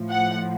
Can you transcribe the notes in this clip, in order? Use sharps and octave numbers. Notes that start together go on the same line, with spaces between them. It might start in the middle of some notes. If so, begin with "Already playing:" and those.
Already playing: A2 F3
F#5